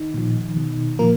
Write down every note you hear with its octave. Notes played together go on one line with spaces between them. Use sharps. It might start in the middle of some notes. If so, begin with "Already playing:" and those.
Already playing: D#3 D#4
A#2 F3
B2
A#2 F3 A#3 A#4